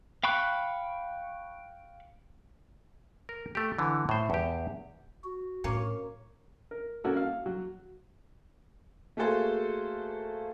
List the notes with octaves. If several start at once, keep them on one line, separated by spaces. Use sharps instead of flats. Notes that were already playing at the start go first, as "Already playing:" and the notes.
F5 G5 B5 C#6 F#6
A#4
A3 G4
D3 E3
A2 C5
E2 G4
F#4
A2 A#3 C#4 C#5
A#4
A#3 C#4 F#4 A4
F5
F#3
A3 A#3 F#4 G#4 A4 C5